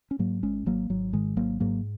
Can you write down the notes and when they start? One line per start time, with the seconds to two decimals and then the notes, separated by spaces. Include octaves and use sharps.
0.11 C#4
0.19 G#2 F#3 A#3
0.43 G#1 G#3 C#4
0.66 G#1 F#3 A#3
0.90 G#1 F#3
1.13 G#2 D#3 G#3
1.36 G#1 F#3 A#3
1.60 G#2 F#3 A#3